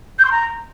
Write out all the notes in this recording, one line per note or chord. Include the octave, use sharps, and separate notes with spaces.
G6
C6
A#5